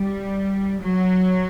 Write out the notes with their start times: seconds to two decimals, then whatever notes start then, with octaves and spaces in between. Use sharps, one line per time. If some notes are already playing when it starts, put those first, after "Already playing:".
Already playing: G3
0.83 F#3